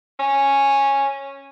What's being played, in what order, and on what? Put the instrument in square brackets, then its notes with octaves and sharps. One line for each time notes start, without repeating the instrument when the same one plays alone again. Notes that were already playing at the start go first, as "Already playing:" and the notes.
[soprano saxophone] C#4